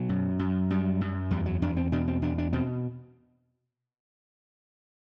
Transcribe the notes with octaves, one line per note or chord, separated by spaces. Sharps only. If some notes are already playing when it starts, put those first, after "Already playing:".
Already playing: B2 F#3
F#2
F#2
F#2 G3
F#2
E2 G3
F#3
E2 D4
C4
B2 D4
C4
E2 D4
D4
B2 C4